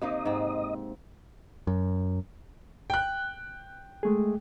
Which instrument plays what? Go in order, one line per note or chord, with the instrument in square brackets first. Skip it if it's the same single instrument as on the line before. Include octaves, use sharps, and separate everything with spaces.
[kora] C3 A#3 D#4 [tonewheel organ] D#5
[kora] G#2 C4
[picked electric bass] F#2
[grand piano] G5 F#6
[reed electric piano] G#3 A3 G#4